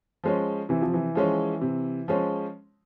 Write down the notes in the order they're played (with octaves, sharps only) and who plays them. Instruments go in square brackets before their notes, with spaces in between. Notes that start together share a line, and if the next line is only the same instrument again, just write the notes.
[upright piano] F3 G#3 C#4
[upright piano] C3 [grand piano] E3
[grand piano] F3
E3
[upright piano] F3 G#3 C#4
C3
F3 G#3 C#4